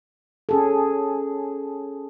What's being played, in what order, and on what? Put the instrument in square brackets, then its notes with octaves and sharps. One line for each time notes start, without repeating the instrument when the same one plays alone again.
[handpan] C#4 G#4 A4